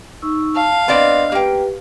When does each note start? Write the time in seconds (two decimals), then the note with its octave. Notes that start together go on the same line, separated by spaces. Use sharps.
0.22 D#4 C#6 E6
0.56 F5 A5
0.88 B3 C4 D4 D5 D#5
1.32 A#3 G4 B4 G5